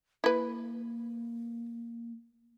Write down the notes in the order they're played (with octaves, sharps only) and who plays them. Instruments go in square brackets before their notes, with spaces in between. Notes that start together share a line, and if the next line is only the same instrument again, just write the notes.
[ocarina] A#3 [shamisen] E4 B4